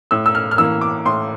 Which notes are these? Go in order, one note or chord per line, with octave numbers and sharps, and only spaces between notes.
A2 E6
E6
F6
F6
E3 A#3 E6
D6
A2 C6